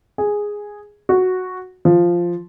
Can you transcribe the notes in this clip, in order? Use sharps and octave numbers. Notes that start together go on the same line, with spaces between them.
G#4
F#4
F3